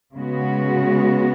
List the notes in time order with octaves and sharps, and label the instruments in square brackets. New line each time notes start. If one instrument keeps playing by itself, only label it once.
[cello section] C#3 G#3 B3 F#4